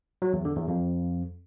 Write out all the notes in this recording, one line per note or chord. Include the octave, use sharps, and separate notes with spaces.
F#3
E2
D3
E2
F2